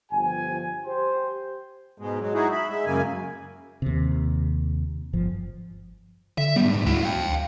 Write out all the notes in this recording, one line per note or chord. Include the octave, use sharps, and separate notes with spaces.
G1 F3 G4 G#5
G4 C5
G#2 B2 G#3
F#3 G#3
D#4 E4 F#4 G#4
E5 B5
G#3 E5
F#2 C#3 A#3 G#5
D#2 C3
G1 F3
D3 E5
G#2 G3 B3
G#3
D2 E4 F#4
F5 G5